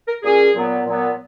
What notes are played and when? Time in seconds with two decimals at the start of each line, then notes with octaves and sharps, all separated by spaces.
0.08 A#4
0.23 A#2 A#3 C#4 G#4
0.55 A#2 F#3 B3
0.85 A#2 F#3 B3